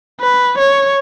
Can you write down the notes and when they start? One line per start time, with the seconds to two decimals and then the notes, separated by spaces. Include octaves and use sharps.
0.21 B4
0.58 C#5